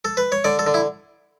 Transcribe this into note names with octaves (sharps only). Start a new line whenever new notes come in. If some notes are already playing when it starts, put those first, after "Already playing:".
A4
B4
C#5
D3 D5
A4
D3
E4